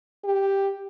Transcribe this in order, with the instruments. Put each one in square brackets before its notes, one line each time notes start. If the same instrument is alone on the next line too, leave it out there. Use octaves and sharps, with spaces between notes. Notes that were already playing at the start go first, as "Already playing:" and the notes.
[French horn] G4